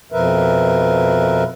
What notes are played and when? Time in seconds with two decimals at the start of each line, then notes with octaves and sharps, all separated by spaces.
0.12 F2 B2 F3 A#4 B4 E5